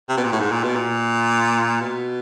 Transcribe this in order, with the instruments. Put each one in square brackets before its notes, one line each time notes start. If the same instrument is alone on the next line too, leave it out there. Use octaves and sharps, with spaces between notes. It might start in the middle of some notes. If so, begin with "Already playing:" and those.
[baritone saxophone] C3
B2
A#2
A2
G#2
A#2
B2
A#2
B2